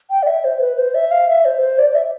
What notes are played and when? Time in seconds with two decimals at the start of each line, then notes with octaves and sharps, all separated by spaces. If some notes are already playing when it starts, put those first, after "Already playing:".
0.10 G5
0.23 D5
0.27 E5
0.44 C5
0.61 B4
0.78 C5
0.95 E5
1.11 F5
1.29 E5
1.45 C5
1.62 C5
1.79 D5
1.90 D5
1.95 E5